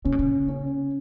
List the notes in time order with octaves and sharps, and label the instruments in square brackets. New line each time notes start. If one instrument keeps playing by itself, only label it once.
[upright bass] C#3 [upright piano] C#4
[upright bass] B2
C#3
[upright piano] C#4